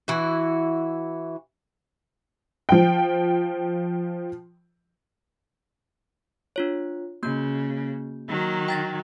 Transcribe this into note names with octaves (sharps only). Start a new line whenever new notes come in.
E3 E4 F#4
F3 G5
D4 F4 C#5
C#3 A#3 F#4 G6
D#3 F#3
G5 A6 A#6